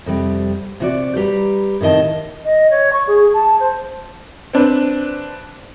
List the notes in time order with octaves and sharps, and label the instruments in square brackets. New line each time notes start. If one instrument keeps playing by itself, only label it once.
[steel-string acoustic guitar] F2 C3 G3
C3 F#4 D5
G3 G4 B4 A#5
A2 C3 D#3 D#5 A5
[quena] D#5
C#5
C#6
G#4
A5
C5
[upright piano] C4 D4 B4